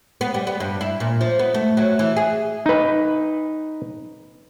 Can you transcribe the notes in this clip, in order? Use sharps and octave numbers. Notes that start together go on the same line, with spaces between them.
B3
G3
B3
G2
E4
A#2
F3
B3
A3
F#3
E3
G#4
D#4 B4